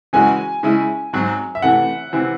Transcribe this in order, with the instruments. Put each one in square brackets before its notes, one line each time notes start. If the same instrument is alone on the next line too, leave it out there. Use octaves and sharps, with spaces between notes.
[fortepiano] C#3 E3 G#3 C#4 F#4 [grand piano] G#5
[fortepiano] C#3 G#3 C#4 E4
G#2 F#3 C4 F#4
[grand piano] E5
[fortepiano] C3 E3 A3 [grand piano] F#5
[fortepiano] C3 E3 C4